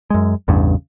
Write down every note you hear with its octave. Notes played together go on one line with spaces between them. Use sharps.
F#2 G#3
A1 E2 G2 C#3